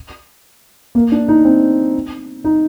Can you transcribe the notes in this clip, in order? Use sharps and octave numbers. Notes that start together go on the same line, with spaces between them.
A#3
D4
D#4
C4
D#4